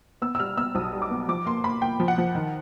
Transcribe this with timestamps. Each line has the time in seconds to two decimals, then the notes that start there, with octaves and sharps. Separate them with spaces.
0.22 B3 E6
0.35 E6
0.40 G3 F6
0.57 B3 E6
0.75 B1 D#6
0.93 G3
1.02 D6
1.11 B3
1.28 F3 D6
1.46 A#3 C6
1.64 A#3 B5
1.82 A#3 G5
2.00 F3
2.08 F#5
2.18 F3
2.35 D#3